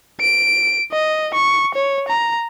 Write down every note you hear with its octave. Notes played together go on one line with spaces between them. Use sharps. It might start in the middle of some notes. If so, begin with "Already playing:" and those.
D7
D#5
C#6
C#5
A#5